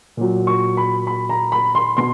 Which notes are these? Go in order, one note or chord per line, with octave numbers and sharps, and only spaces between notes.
A#2 F#3
C#6
B5
B5
A#5
B5
C6
B2 C6